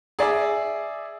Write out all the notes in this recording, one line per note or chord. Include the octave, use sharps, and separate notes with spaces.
G#4 D5 E5